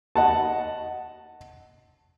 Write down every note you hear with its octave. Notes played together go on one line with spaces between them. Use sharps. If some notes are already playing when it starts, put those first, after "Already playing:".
D#5 F#5 A5